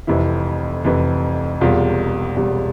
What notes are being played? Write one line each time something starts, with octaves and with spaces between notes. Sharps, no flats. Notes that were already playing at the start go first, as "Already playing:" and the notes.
F1 F2 C3 E3 E4
F1 F2 C3 E3
E1 E2 C3 G3 F4
E1 E2 C3 G3